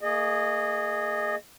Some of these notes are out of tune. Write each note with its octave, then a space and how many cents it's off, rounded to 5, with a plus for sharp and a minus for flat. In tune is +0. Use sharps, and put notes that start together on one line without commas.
A#3 -35 G#4 +0 D#5 -25